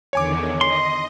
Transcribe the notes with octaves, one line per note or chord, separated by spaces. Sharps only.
E2 D3 D#3 C#5 G#5 D6
D#5 C6